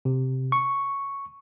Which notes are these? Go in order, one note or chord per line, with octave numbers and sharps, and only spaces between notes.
C3
C#6